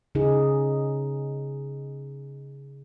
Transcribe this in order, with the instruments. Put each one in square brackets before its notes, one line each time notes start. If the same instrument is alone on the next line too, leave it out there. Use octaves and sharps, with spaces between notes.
[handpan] C#3 D#4 G#4